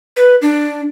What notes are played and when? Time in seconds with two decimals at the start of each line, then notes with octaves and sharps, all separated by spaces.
0.17 B4
0.42 D4